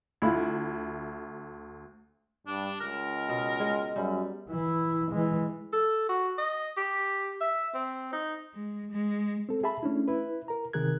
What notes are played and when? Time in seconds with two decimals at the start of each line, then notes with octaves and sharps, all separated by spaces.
0.22 D2 E4 F4 E5
2.47 G2 D4
2.80 C#2 A#4
3.29 B2
3.60 G#3
3.96 F#2 G3
4.49 E3 E4
5.11 E3 G#3
5.73 A4
6.09 F#4
6.38 D#5
6.77 G4
7.41 E5
7.74 C4
8.13 D#4
8.55 G#3
8.91 G#3
9.49 C4 A4
9.64 G#4 E5 A5 B5
9.83 A3 C#4 D4 E4
10.08 E4 B4
10.48 A#4 A#5
10.73 C3 D#3 G#4 A#4 F#6 G#6